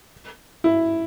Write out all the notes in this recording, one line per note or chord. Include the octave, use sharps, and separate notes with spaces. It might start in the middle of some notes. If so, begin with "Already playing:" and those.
E4